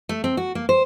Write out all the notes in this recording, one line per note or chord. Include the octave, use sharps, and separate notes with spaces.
A3
C4
F#4
A#3
C5